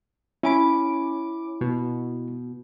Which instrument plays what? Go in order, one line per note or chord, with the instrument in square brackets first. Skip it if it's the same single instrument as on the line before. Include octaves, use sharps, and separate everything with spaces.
[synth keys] C#4 D6 D7 [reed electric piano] E4 G#5 B5
[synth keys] B2